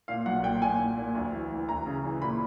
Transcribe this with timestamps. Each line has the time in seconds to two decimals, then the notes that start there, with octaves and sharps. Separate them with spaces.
0.08 A#2 F5
0.26 B1 F#5
0.44 A#2 G5
0.62 A#2 G#5
0.79 A#2
0.97 A#2
1.15 D2
1.32 E3
1.51 E3
1.68 D2 A#5
1.86 C#3
2.04 E3
2.22 A#2 B5